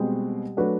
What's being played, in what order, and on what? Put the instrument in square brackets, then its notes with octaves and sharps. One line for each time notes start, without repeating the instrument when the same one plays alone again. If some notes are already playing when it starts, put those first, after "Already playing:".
Already playing: [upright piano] B2 G#3 C4 [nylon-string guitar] G3
[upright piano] F#3 A3 D4 F#4 B4